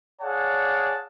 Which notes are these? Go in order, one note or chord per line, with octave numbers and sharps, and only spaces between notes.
G#4 C#5 D5 F5 F#5 A5